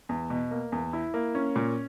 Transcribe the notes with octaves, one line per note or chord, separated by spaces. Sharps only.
E2
B2
A#3
E2
E4
A#3
C#4
A#2